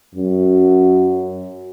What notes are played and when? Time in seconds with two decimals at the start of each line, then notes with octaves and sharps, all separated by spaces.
0.15 F#2